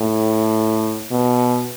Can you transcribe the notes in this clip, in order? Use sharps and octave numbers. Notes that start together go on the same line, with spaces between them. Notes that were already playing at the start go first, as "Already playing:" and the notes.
Already playing: A2
B2